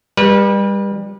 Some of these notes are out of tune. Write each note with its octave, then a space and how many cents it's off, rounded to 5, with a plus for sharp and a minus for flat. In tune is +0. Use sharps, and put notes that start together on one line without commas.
G3 +30 B4 -25